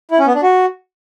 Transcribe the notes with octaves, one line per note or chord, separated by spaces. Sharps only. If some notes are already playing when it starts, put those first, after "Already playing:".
E4
C#4
B3
D4
F#4